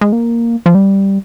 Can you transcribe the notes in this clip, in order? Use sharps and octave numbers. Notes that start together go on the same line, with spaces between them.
G#3
A#3
F3
G3